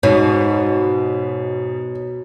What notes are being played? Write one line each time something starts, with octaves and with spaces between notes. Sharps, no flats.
G#2 B2 C#5